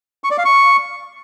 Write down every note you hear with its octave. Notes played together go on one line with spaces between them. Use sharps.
C#6
D5
F5
C#6